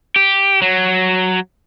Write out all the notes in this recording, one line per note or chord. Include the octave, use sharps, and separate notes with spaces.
G4
F#3